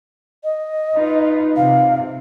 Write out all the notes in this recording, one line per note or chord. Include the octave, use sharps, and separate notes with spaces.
D#5
D#4 F4 B4
C3 F5